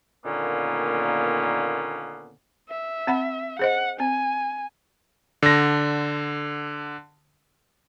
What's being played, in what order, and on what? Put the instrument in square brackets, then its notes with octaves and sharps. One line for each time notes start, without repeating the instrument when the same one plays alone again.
[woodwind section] A#2 D3 D#3 A#3 B3 C#4
[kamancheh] E5
[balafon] C4 F#5 B5
[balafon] G#4 C5 D#5 [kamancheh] F#5
[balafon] C4 [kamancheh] G#5
[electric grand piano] D3 A#6